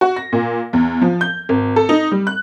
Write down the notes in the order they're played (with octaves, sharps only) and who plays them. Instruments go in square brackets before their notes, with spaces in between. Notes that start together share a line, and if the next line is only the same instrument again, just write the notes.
[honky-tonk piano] F#4
A#6
A#2
E2
F3
G6
G#1
A4
D#4
G3
F#6